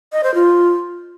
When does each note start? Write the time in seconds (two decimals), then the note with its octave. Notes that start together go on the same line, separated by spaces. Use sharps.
0.12 D#5
0.24 C5
0.35 F4